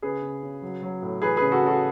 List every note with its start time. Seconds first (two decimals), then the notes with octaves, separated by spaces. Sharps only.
0.02 C#3 G#4 B4
0.22 C#3
0.43 C#3
0.62 F#3
0.82 F#3
1.02 A2
1.22 E3 G#4 B4
1.37 C#3 G#4 B4
1.51 F#4 A4
1.62 C#3 F#4 A4